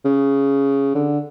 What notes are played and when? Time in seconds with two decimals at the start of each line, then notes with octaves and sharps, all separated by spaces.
0.05 C#3
0.95 D3